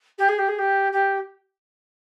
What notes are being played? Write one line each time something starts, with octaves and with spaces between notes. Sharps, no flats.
G4
G#4
G4
G#4
G4
G4